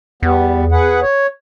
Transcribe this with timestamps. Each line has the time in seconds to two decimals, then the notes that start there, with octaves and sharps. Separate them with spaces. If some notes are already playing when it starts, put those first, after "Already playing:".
0.23 E2 G3 B3
0.72 G#4 B4 F#5
1.02 C#5